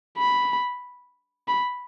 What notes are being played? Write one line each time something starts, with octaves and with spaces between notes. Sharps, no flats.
B5
B5